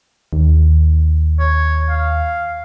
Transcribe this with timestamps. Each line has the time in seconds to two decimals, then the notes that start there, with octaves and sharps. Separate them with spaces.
0.33 D#2
1.39 C#5
1.90 F5